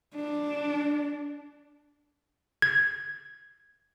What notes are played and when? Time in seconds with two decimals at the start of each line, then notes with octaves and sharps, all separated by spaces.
0.15 D4
2.62 G#6